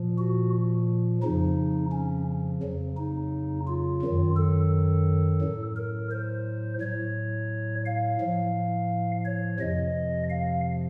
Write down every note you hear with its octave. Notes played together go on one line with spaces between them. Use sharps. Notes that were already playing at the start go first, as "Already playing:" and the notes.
Already playing: A#2 F3
F#4
F2 C#3 F3 D#4
C#4
F2 C#3 F#3
D#4
F4
F#2 D#3 F#3
A4
A2 F#3
A#4
C5
A2 F#3 C#5
F5
A2 F3
C#5
F2 C3 F3 D#5
F5